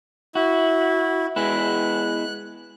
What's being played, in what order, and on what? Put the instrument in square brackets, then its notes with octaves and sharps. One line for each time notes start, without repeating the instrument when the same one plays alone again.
[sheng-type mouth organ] E4 [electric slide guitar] F#4
[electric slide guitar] G#3 B3 E4 [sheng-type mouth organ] F#6